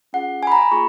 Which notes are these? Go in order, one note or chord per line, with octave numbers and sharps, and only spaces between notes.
C#4 F4 G#4 F#5
G#5
B5
A#5
B5
A#3 F4 G#4 C#6